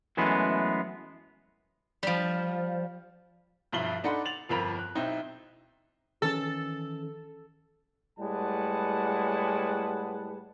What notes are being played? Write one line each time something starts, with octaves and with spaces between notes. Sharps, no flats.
F#2 E3 G#3 A3 B3
F3 G3
B1 G2 F3 E4 F#7 G7
D4 D#4 A4 F#5 B5 C6
A6 F7 F#7
G1 F2 F3 A#4 B5 F7
F#6
B1 C4 D#4 E4
D#3 E3 C#4 A4
A2 G3 G#3 B4 F#5 A5